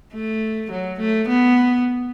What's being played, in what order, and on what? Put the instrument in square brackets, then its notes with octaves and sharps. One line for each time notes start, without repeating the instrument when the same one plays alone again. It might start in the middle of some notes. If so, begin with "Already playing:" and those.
[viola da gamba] A3
F#3
A3
B3